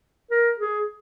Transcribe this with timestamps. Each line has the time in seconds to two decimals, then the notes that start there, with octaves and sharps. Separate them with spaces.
0.31 A#4
0.59 G#4